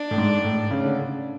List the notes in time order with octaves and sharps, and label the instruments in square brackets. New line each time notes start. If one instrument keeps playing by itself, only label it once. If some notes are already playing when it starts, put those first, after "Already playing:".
Already playing: [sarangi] D4
[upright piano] A2
G#2
A2
C#3
D3